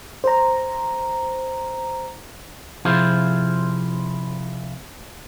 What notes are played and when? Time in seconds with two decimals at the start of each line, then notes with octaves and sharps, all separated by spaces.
0.24 C5 A#5
2.85 C3 F3 E4 F4 G#4 C5